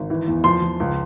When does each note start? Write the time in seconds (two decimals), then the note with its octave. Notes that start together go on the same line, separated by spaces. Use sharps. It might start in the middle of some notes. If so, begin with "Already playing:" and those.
Already playing: G#1
0.10 E3
0.27 E2
0.44 F3 C6
0.62 F3
0.80 C#2